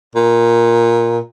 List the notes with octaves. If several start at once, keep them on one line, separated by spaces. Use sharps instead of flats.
A#2